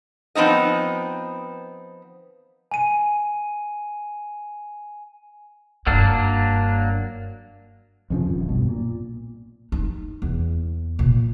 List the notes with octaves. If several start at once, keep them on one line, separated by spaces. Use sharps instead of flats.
F3 B3 C4 D#4 D#5
G#5 D#7
F#1 G2 F#3 A#3 D4
F2 C#3 F3
D#1
B1 G2 B2
A#2
D#4
E2
A#2